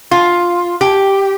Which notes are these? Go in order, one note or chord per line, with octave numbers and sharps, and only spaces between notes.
F4
G4